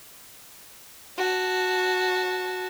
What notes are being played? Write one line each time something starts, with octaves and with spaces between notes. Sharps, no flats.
F#4 A5